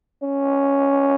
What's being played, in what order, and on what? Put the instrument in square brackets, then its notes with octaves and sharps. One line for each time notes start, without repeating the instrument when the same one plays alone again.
[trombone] C#4